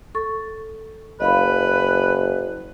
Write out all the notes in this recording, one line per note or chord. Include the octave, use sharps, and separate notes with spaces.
A4 C#6 A6
F#1 B4 D#5 F5 B5